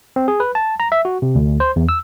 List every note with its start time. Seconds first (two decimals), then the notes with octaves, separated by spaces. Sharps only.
0.16 C4
0.28 G#4
0.40 B4
0.55 A5
0.80 A#5
0.92 E5
1.05 F#4
1.22 C3
1.35 D2
1.60 C5
1.76 E2
1.89 E6